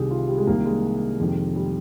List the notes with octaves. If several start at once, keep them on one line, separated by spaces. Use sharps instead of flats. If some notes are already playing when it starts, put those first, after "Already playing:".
Already playing: C2 C3 D#3 G4 G#4
F4
G3
G#3
C2 C3 D#3 A#3
G#3
F2 C3 D#3
G3